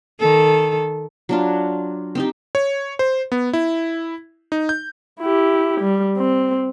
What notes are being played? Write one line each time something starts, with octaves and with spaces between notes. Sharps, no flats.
D#3 A4
F#3 D4 F4
C4 D#4 G4
C#5
C5
B3
E4
D#4
G6
E4 G4
G3
C4